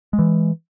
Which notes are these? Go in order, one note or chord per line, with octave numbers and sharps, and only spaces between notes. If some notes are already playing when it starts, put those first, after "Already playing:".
G#3
E3